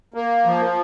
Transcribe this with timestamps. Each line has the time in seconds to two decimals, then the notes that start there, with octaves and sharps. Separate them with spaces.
0.14 A#3
0.46 F3